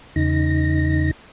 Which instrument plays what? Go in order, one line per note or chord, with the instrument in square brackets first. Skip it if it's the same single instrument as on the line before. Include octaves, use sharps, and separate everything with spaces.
[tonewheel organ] E2 C#3 D#4 A#6